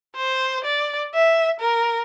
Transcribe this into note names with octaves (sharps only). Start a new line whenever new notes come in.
C5
D5
E5
A#4